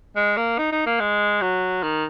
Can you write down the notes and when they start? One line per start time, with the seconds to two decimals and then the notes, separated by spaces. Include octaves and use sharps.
0.16 G#3
0.37 A#3
0.58 D#4
0.72 D#4
0.86 A#3
1.00 G#3
1.41 F#3
1.83 D#3